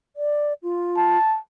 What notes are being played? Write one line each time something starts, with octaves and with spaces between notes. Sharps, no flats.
D5
F4
A5